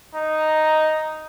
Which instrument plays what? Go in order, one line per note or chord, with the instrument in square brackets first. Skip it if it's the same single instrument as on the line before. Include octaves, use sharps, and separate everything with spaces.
[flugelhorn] D#4